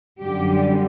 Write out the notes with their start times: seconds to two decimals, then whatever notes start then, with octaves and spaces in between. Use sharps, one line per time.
0.21 F#2 D3 G3 G4